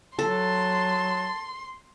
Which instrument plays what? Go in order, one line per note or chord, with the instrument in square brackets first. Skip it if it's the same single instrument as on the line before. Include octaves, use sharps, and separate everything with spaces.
[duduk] F#3 [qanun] A4 [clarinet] A5 [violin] C6